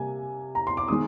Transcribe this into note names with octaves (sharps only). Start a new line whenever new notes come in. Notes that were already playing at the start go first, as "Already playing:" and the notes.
Already playing: C3 G3 A#3 G#5
A#5
C6
D6
D#3 G#3 C6 D#6